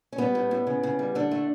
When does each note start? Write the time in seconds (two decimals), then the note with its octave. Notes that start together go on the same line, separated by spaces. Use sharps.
0.12 C#4
0.18 G3 B3
0.35 A2
0.51 A2
0.67 C#3
0.83 C#3
0.99 G3
1.15 D3 D4
1.31 A3